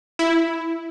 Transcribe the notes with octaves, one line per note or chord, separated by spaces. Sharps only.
E4